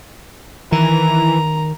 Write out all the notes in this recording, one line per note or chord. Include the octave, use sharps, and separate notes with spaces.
D#3 E3 A#5